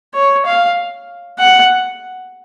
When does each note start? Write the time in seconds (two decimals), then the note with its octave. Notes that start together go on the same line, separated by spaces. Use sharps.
0.14 C#5
0.46 F5
1.40 F#5